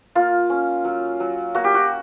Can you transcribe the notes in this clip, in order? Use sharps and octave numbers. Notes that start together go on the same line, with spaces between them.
A#3 F4
C#4
F#3
F#3
A#3 F#4
G4
F#4